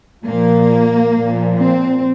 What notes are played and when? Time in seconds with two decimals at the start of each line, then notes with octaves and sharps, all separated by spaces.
0.24 A#2 F3 A#3
1.14 A#2 F3
1.58 C4